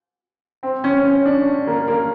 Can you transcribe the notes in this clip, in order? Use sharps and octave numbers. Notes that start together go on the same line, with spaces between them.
C4
C#4
C#4
D4
A#3
A#3